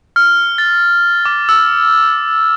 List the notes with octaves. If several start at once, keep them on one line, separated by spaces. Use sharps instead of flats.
F6
A6
D6
E6